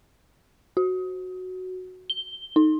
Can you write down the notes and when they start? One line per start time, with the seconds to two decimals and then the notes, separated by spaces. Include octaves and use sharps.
0.77 F#4
2.10 G7
2.56 D#4